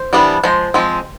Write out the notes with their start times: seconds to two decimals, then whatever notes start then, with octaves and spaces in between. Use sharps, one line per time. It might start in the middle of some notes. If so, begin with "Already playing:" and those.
Already playing: C5
0.13 E3 G3 B3 D4
0.43 F3 G#3 C5
0.74 F3 G#3 C4